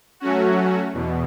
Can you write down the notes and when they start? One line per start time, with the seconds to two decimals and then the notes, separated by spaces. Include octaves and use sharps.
0.20 F#3 A3 C#4 F#4
0.93 E2 B2